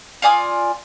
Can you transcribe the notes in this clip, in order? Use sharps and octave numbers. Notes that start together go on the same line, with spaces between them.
F4 D5 G#5 D#6